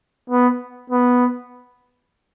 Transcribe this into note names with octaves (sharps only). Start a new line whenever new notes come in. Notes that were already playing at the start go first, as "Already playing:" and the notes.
B3
B3